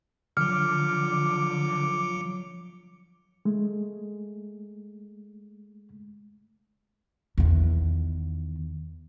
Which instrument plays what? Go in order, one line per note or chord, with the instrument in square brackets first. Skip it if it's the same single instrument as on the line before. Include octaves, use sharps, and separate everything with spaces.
[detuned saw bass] D3 [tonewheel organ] F3 D6 [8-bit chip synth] F#3 C#7 [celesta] F6
[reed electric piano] G#3 A3
[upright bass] E2 D#3